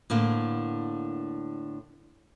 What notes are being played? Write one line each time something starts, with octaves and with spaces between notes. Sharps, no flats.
A2 D3 A#3 B3